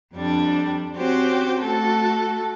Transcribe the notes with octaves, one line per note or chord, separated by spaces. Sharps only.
F2 G3 D4
C4 C#4 F#4 G4 C5
A3 F#4 A4